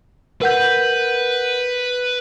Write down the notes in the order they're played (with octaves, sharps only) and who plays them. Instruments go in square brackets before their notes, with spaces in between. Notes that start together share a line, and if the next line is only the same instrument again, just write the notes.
[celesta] A#4 F#5 G6 [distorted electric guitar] B4